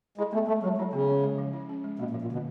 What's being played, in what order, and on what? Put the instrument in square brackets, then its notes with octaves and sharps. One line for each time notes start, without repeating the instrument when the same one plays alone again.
[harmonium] G#3 [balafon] E4
[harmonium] A3 [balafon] B3
[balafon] G#3 [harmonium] A3
[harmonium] F#3 [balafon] G#3
[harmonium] F#3 [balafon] E4
[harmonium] C#3 [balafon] B3
[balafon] C#4
G#3
F3
E4
C#4
G#3
[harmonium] B2 [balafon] A#3
[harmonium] A#2
[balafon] F3
[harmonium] A#2
[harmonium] B2 [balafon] D3